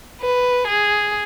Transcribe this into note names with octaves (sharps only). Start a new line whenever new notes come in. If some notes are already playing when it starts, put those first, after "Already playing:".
B4
G#4